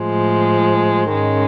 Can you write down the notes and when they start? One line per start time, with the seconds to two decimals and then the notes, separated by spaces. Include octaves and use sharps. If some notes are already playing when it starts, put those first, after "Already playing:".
Already playing: A2 F3 G#3
1.12 G#2 D#3 G#3 C#4